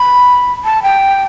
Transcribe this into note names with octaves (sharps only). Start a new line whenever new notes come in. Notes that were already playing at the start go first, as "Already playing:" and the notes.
Already playing: B5
A5
G5